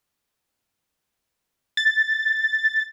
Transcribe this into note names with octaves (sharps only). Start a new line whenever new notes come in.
A6